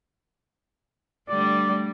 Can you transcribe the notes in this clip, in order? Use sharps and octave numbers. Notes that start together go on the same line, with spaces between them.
D3 G3 A3 D5